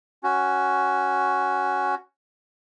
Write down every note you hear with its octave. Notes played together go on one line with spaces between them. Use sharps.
C#4 F#4